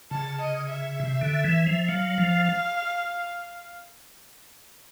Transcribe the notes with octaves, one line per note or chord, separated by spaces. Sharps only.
C#3 A5
D#5
E5
C3
D3
E3
F3
F#3 F5
F3